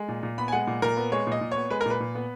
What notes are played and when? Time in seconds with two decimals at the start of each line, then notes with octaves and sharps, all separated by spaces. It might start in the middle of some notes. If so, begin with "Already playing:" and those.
Already playing: G#3
0.09 A#2
0.23 A#2
0.38 B3 B5
0.48 G#5
0.52 G#3 F#5
0.67 A#2
0.82 A#2 A#4
0.97 B3
1.12 G#3 C#5
1.27 A#2 D#5
1.41 A#2
1.51 B3 C#5
1.70 G#3 B4
1.81 A#4
1.86 A#2 B4
2.00 A#2
2.15 B3